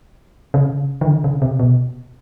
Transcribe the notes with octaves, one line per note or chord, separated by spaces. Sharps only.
C#3
D#3
D3
C#3
C3
B2